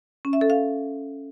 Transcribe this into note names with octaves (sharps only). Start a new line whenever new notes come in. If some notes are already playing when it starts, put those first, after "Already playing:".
C#4
E5
A4
F5